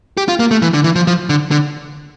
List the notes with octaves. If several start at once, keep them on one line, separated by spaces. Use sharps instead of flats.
G4
F4
A#3
A3
E3
D3
E3
F3
F3
D3
D3